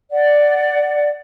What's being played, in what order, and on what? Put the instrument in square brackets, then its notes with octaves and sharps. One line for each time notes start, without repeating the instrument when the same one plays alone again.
[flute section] D5 F#5